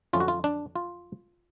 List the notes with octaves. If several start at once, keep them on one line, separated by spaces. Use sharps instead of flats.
F2 D3 F#3 A3 C#4 F4
F#4
F4
D4
F4